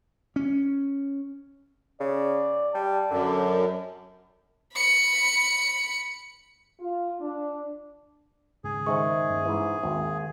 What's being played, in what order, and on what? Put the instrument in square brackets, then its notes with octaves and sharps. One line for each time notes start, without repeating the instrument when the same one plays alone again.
[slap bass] C#4
[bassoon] C#3 [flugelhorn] D5
[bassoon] G3 [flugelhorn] A5
[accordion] F#2 [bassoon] D3
[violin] B5 C#7
[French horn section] F4
D4
[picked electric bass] D#2 G#2 C#3 [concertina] G#4
[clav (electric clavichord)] D#3 G#3 [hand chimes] C5 E5 C#6
[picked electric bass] G2 A#3 C#4
[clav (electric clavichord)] G#2 E3
[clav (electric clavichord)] G#1 [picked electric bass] D#2